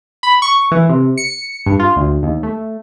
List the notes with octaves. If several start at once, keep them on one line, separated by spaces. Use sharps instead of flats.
B5
C#6
E3
C3
C#7
G2
F4
D2
D#2
A3